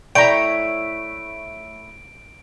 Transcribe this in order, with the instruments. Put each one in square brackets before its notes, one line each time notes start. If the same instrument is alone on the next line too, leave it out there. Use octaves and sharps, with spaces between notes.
[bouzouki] A3 E4 C#5 [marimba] D5 [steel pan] G5 A#5 [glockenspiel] D7